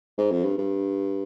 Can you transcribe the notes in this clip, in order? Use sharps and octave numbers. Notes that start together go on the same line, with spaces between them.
G#2
F2
G2
G2